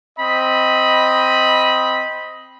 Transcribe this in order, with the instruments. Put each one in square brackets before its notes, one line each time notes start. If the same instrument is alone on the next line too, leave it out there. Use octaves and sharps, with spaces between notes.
[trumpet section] C4 D#5 B5